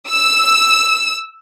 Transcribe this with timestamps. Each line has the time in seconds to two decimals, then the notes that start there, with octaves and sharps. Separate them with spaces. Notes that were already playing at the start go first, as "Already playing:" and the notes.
0.10 E6